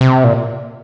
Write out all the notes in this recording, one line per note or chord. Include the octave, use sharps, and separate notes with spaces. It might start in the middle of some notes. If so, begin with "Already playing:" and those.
C3
A#2